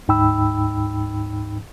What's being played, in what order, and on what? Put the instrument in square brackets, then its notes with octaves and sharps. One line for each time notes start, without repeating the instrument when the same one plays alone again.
[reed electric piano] D2 G#2 D#4 G5 B5 E6